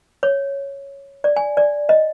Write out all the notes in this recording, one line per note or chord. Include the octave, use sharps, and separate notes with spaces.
C#5
D5
G#5
D5
D#5